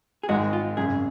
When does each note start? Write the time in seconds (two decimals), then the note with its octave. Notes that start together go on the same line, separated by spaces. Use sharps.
0.23 G#4
0.29 G#1 G#2 D#3 G#3 F#4
0.53 F4
0.77 G#1 F#2 C#3 G#4